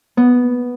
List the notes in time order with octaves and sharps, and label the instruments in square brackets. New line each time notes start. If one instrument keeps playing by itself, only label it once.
[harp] B3